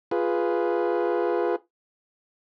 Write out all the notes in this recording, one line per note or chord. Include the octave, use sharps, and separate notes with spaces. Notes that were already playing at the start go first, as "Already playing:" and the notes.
F4 G#4 B4